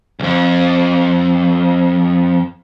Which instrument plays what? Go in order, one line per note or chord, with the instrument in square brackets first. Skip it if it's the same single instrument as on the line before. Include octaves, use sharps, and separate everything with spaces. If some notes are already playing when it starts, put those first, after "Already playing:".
[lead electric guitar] C2 F2